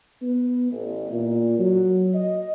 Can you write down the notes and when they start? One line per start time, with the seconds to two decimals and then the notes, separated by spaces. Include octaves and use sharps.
0.22 B3
0.72 A1
1.11 A#2
1.59 F#3
2.15 D#5